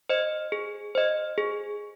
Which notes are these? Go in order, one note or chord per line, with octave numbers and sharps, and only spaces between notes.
C5 D#5
G#4
C5 D#5
G#4